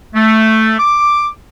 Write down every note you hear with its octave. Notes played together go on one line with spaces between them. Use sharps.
A3
D6